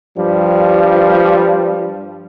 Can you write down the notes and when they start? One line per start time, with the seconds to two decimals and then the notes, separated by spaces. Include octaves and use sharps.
0.17 G2 F3 G3